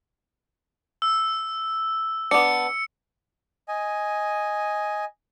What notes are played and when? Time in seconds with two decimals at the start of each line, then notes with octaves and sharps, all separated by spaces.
1.02 E6
2.31 B3 D4 C#7
3.68 D#5 G#5